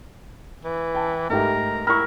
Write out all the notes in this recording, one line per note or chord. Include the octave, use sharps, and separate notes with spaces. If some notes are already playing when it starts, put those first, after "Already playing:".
E3
G5 A5
G#2 A3 G4 A#4
E4 A#4 C#6